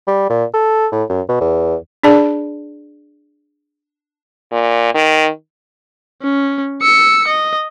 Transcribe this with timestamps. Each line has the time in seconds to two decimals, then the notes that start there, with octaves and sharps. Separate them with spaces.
0.07 G3
0.30 A#2
0.54 A4
0.92 A2
1.09 F#2
1.28 B2
1.41 E2
2.04 D4 G#4 D5 A5
4.52 A#2
4.94 D#3
6.22 C#4
6.82 E6 C#7
7.28 D#5